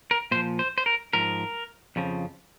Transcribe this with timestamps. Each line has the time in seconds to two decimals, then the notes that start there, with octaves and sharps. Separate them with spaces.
0.11 A#4
0.31 A#2 C5
0.35 F3
0.59 C5
0.78 C5
0.86 A#4
1.13 G#2 F3 A#4
1.96 F2 C#3 F3